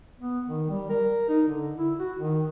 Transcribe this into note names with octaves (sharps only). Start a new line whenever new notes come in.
B3
D#3
G3
A#4
D#4
D3
E4
F#4
D#3